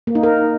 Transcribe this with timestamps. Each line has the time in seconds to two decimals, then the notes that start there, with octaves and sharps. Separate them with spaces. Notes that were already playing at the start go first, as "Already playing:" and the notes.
0.07 A#3
0.15 D#4
0.23 A#4